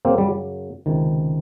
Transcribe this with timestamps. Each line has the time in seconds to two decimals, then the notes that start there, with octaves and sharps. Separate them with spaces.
0.05 F#2 C#3 F#3 A#3 C4
0.18 G3
0.86 C#2 C3 D#3